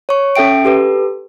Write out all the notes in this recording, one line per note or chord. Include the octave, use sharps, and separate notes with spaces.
C#5 C#6
C#4 A4 E5 G5 D7
G4 A4 B4